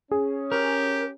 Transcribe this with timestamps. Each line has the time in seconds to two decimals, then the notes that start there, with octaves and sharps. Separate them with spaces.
0.12 C#4 G#4
0.52 G4 A#4